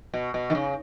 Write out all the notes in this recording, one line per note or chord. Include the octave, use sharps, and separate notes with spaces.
B2
B2
D#3
C#3